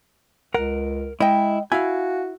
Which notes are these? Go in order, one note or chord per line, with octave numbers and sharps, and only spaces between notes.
C#2 A#4 F#5
G#3 E4 D#5 G5
E4 F#4 F5 G#5